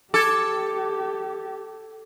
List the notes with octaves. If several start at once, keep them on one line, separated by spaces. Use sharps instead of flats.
G4 A4 D6 G#6